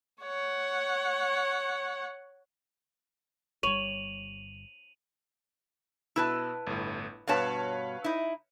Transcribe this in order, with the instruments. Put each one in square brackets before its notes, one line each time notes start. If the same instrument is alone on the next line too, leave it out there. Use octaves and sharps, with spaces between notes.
[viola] C#5 F#5
[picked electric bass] G1 G3 [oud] C#5 [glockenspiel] D#7 F7 F#7
[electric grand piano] B2 E6 [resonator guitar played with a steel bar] E4 B4 A5
[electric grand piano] G1 A2
[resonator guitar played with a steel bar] G2 B2 A5 [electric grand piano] B4 C#5 F5
[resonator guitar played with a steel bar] D#4 E4